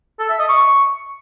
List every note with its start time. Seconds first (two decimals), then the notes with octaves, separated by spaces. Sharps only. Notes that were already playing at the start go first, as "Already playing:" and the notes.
0.19 A4
0.29 E5
0.39 D#5
0.49 C#6